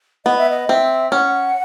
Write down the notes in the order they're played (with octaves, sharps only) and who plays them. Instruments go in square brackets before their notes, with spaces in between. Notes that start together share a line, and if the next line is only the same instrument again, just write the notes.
[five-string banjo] B3 [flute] D#5
[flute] E5
D#5
[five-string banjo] C4 [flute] E5
[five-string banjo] C#4 [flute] F#5